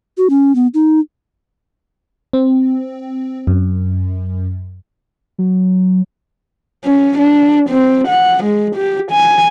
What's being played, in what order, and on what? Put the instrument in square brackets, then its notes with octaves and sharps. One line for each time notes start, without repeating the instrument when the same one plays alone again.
[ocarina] F#4
C#4
B3
D#4
[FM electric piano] C4
F#2
[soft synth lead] F#3
[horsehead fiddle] C#4
D4
C4
F#5
G#3
G4
G#5